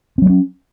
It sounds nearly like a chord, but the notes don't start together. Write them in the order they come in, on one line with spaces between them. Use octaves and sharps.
C4 F#3 A3 C#4